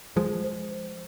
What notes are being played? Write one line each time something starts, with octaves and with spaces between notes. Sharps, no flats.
F3 G#3 C5
C5
C5